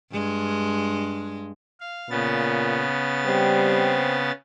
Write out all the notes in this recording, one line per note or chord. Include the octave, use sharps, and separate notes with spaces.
G2 G#3
F5
A#2 C#3 B3 A6
G3 C4